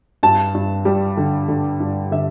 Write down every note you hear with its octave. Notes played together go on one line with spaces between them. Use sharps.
G2 A5
G2
G3
D3
D3
G2
D3 E5